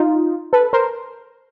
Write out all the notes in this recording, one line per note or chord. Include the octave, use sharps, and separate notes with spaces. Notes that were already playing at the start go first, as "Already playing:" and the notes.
Already playing: D#4 F4
A4 B4
A#4 C5